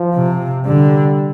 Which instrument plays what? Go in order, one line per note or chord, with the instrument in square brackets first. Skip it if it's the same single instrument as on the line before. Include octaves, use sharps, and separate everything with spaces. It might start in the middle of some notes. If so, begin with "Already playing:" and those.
Already playing: [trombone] F3
[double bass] C3
[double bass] D3 [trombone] G3